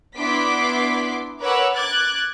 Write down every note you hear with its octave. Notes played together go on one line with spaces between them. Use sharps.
B3 D4 E4 C6 D6 B6
A#4 B4 C#5 F#5 D6 E6
D6 F#6 G#6 A6